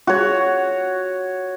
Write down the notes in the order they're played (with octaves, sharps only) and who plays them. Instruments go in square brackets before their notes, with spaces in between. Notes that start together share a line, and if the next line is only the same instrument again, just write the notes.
[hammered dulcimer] F#4 C#5